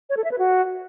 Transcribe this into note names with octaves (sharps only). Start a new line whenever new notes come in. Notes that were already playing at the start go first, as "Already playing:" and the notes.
C#5
A4
E5
B4
F#4